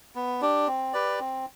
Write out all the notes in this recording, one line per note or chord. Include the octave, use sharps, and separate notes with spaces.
B3
D4 G4
C4
G4 B4 D5
C4